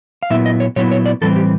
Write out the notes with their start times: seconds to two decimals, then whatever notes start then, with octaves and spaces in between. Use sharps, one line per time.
0.23 F5
0.30 A#2 F#3 B3 E4 E5
0.45 D#5
0.60 C#5
0.76 A#2 F#3 B3 E4 C#5
0.91 C#5
1.06 D5
1.21 A2 E3 G3 C4 A4
1.36 G4